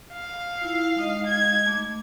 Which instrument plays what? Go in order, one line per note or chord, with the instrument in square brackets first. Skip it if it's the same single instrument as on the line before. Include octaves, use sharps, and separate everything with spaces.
[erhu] F5
[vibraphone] E4 F4
G#3 D#4 D#5
[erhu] G#6
[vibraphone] A3 D6